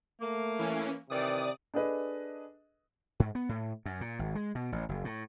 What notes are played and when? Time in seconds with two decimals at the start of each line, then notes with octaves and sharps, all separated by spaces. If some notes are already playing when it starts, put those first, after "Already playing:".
0.21 A3 A#3
0.59 E3 C#4
1.10 C3 D#3 E3 D5 D#6
1.74 D4 G#4 A4 B4 D#5
3.20 G#2
3.35 B3
3.49 A2
3.86 F#2
4.01 A#2
4.19 G#1
4.35 G#3
4.55 B2
4.72 A1
4.89 F#1
5.05 A2